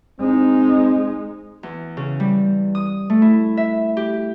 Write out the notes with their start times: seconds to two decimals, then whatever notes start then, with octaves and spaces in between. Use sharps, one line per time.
0.20 G#3 C4 D#4
1.63 E2
1.97 C#3
2.20 G3
2.75 D#6
3.10 A3
3.22 E4
3.57 E5
3.97 G4